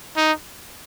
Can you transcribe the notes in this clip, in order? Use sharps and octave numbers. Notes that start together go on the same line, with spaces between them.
D#4